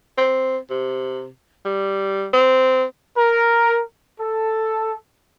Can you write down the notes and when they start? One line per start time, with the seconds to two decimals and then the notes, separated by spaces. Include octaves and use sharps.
0.17 C4
0.70 C3
1.65 G3
2.33 C4
3.17 A#4
4.19 A4